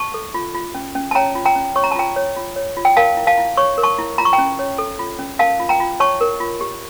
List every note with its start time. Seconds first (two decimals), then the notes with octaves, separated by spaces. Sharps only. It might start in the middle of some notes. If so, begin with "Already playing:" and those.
Already playing: A5 C#6
0.14 A4
0.34 F4
0.54 F4
0.74 C#4
0.95 C#4
1.11 A5
1.15 C#5 G5 A#5
1.35 F4
1.45 G5 A#5
1.56 C#4
1.76 C#5 C#6
1.84 A#5
1.91 A5
1.96 F4 G5 A#5
2.16 C#5
2.36 F4
2.56 C#5
2.77 F4
2.85 G5
2.97 A#4 F5 A5
3.17 E4
3.27 F5 A5
3.38 E4
3.57 C#5 C#6
3.78 A#4
3.83 A5 C#6
3.99 E4
4.18 F4 A#5
4.25 C#6
4.33 G5 A#5
4.38 C#4
4.59 C#5
4.78 A4
4.99 F4
5.19 C#4
5.39 A#4 F5 A5
5.59 F4
5.69 G5 A#5
5.80 F4
6.00 C#5 A5 C#6
6.21 A#4
6.40 F4
6.61 G4